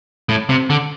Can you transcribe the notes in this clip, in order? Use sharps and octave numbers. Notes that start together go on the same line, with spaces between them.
A2
C3
D3